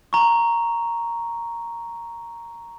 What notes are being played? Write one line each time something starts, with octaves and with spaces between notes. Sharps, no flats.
A#5 C#6